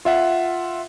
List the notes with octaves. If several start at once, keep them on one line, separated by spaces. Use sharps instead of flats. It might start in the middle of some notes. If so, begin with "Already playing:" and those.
F4 E5 F#5